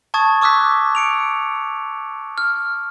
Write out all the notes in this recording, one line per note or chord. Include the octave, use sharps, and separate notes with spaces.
A5 C#6 D#6 G#6 A6
C#6 D6 E6 F#6 B6
C#7 D7 F7
F6